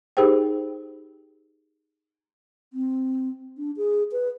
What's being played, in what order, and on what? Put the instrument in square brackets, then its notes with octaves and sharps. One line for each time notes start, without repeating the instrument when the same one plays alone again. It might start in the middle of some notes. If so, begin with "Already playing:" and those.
[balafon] D#4 G4 G#4 A#4 C5 G5
[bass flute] C4
D4
G#4
B4